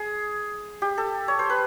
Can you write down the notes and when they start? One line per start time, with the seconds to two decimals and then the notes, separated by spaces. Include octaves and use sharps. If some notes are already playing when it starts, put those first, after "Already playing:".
Already playing: G#4
0.82 G4
0.98 A4
1.28 C#5
1.39 C5
1.50 B4